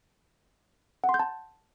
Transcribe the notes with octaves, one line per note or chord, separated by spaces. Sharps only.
F#5
C6
G6
A5